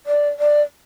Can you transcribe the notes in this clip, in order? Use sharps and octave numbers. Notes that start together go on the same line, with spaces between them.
D5
D5